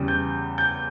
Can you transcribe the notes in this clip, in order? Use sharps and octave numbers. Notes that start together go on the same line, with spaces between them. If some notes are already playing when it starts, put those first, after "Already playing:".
Already playing: E2 C#3 G3
G6
G6